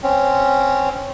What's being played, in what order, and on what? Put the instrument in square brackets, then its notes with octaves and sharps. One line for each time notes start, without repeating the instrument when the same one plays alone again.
[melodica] C4 C#4